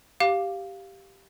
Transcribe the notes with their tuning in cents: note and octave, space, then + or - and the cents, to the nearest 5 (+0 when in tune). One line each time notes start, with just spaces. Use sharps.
G4 -5 F5 +0 D6 +0